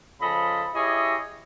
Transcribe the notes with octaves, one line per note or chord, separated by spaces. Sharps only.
C#3 F3 A4 D#5 B5
E4 G4 G#4 C#5 D#5 E5